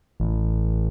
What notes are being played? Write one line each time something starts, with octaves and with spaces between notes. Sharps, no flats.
A1